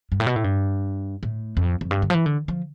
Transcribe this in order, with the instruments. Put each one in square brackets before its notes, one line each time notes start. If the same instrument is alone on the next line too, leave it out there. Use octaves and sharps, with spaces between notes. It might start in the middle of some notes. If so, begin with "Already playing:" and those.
[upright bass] G2
A2
B2
A2
G2
A2
F2
F2
G2
D3
F3
E3
D3
F3